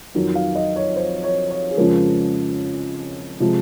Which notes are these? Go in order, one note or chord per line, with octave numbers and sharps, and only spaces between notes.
F2 D#3 F#3
F5
D#5
C#5
C5
C#5
C#5
G#4
F2 C#3 F3 G#3 A#4
C3 F3 G#3